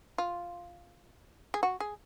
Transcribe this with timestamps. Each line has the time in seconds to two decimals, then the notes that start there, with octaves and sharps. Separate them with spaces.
0.18 F4
1.54 G#4
1.63 F#4
1.80 G#4